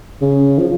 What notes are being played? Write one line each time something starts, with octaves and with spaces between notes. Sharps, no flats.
C#3
F3